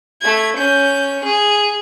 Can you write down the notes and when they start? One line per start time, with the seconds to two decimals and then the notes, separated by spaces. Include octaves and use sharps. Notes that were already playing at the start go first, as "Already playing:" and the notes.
0.21 A3 G#6
0.56 C#4 G6
1.24 G#4